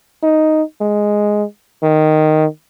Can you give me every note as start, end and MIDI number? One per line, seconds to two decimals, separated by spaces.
0.23 0.62 63
0.81 1.43 56
1.83 2.45 51